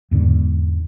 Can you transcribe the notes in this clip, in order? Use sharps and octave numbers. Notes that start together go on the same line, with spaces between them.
E2 G#2 D3